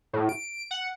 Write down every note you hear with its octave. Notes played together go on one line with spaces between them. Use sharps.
A2
D7
F#5